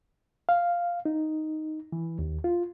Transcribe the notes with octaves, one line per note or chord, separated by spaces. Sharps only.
F5
D#4
E3
D#2
F4